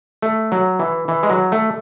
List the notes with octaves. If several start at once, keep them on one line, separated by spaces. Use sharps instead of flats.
A3
F#3
E3
E3
G#3
F#3
A3